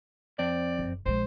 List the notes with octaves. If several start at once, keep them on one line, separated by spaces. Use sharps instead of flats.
F2 C4 D5
F#1
A#1 G#3 C5